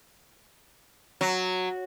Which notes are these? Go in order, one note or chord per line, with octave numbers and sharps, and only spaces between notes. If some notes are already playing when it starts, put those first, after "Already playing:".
F#3